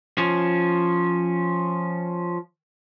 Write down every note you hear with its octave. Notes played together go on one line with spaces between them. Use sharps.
F3 C#4